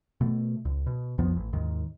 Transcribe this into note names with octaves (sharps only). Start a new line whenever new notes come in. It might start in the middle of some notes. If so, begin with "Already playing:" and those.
B2 A3
C#2
B2
B1 F2 F3 B3
A1
D#2 G#2 D#3